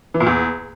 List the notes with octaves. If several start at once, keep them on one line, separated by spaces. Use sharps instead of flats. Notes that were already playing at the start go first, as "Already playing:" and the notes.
E3
A#2
E2